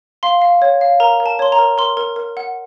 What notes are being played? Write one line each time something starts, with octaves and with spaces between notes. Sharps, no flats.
F5 C6
F5
C#5
F5
A#4 A#5
A#4
A5
C#5 C6
A#5
A#4
A#4 C6
A#4
A#4
F#5